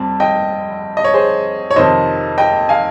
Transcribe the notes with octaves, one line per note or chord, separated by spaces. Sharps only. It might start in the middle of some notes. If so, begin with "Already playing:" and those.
Already playing: F2 C3 G3 C4
D#5 G5
D#5
C#5
G#4 C5
C#5
F2 C3 D#3 C5 D#5
D#5 G5
F5 G#5